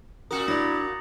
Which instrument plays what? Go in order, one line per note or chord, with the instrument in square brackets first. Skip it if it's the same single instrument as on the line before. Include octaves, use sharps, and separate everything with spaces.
[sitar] A#2 F#4 A#4 [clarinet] C#4 [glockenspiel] D#6 C#7 F#7
[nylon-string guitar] D4 D5 [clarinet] E4 [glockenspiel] A#5 A6 A#6